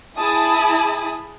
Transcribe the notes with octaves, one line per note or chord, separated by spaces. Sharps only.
E4 G#4 G#5 A5 B5 D#6